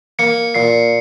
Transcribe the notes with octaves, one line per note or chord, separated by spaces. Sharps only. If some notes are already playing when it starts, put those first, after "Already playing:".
A#3 C#7
A#2 C7